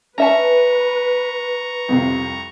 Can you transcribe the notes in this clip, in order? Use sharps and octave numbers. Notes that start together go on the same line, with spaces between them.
C#4 B4 E5 A5 A#5 C#6
C2 F2 C3